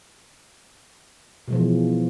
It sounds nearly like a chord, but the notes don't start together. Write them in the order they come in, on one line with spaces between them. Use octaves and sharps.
B2 G#3 F3 E3